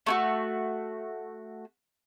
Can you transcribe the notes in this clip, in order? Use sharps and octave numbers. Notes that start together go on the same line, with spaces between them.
A3 E4 F#4